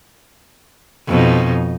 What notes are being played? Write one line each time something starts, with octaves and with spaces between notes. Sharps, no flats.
F2 B2 D#4